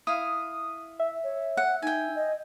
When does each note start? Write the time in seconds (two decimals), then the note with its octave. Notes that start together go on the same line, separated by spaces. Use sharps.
0.07 E4 F5 D#6
1.00 E5
1.24 C#5
1.57 F#5
1.82 D#4 G5 G#5
2.15 D#5